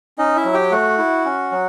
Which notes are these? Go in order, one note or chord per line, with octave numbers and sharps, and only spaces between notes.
C#4 D#4 D#5
E4 E5
F#3
G4 G5
A3 F#4 F#5
E4
C#4
F#3